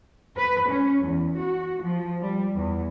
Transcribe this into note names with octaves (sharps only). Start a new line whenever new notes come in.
B4
C#4
E2
F#4
F3
G3
E2